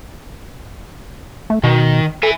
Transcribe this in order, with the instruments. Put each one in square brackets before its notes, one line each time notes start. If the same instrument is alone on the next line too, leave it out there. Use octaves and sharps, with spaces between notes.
[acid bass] A3
[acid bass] B2 [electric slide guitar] D#3
[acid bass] A4 [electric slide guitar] E5 G#5